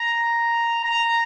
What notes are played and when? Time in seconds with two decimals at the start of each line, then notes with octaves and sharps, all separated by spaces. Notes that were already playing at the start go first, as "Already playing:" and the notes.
Already playing: A#5
0.84 A#5